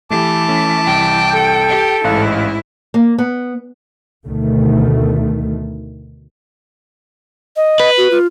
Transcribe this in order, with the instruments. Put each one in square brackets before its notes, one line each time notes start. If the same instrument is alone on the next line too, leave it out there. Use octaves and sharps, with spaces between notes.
[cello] E3 [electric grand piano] A3 G4 [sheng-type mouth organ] A5 D6
[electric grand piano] A3 C#4
[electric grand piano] C2 [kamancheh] G5
[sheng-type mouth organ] A4
[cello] G4
[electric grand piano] A1 F5 F#6 [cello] G#2 E4
[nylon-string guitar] A#3
B3
[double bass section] D2 B2 D#3 A3
[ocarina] D#5
[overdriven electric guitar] B4
[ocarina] F#4
F4